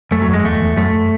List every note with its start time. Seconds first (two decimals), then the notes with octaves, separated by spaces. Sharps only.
0.11 F#2 A3
0.22 F#3
0.28 F#2
0.33 G#3
0.44 E2 A3
0.60 E2
0.77 F#2 A3